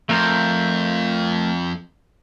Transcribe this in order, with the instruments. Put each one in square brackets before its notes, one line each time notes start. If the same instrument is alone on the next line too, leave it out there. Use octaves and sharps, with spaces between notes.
[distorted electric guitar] F2 [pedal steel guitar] A3 A#4 C5